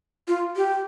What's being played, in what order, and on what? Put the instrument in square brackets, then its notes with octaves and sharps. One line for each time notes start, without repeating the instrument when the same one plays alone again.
[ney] F4
G4